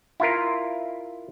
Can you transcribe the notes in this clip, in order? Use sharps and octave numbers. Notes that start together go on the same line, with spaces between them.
E4 F4 A#4